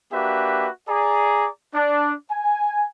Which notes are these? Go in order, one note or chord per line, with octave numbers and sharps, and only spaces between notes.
A#3 D4 F#4 G4 B4 E5
G#4 D5 A#5
D4
G#5